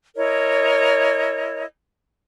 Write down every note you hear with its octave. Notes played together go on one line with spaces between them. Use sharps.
E4 A#4 C#5 D#5